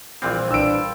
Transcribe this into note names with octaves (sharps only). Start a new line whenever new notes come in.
A#1 E3 G3 C4 F4
D4 B4 E6 D7